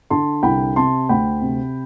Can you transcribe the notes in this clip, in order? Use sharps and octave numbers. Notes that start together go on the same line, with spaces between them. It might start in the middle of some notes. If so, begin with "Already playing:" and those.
D3 A5 C6
C2 G5 B5
C3 A5 C6
D2 G5 B5
C3